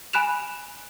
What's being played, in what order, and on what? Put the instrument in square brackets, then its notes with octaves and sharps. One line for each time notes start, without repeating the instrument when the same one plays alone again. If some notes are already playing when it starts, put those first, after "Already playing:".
[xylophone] G#5 B5 F#6 E7 F7